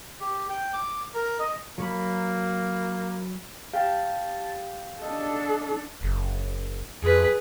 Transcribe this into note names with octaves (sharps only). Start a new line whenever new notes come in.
G4
G5
D6
A#4
D#5
F#3 A#3 B5
G4 F5 G5 A5
D4 A4 D#5
F#1
F2 G#4 B4